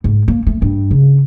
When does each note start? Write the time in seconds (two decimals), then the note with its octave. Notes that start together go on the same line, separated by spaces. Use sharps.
0.04 G#2
0.28 A#3
0.47 A3
0.62 G2
0.91 C#3